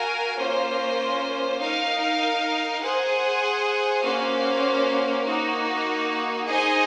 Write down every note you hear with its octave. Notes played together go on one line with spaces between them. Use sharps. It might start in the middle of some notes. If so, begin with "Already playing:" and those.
Already playing: F#4 A#4 F5 G#5
A#3 C#4 F4 C5
D#4 A#4 F5
G#4 C5 F#5
A#3 C#4 F#4 C5 F5
A#3 D#4 F#4
D#4 G#4 C5 D#5 G#5